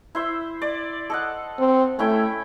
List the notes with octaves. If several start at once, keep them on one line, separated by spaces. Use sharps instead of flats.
E4 C5 E5
D5
A4 D#5 F#5
C4
A3 C#4 E4 G5